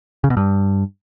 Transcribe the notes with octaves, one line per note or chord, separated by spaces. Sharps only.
C#3
B2
G2